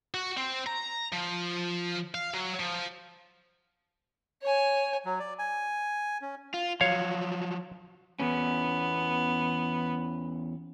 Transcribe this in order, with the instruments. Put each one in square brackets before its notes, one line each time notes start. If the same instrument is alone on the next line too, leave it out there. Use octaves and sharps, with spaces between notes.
[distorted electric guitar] F#4
C4
A#5
F3
F5
F#3
F3
[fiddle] C#5 G#5
[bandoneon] F#3
D5
G#5
C#4
[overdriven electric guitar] F4
[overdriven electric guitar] F3 F#3 [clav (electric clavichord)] C#5 F5
[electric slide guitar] E2 C#4 [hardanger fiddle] B3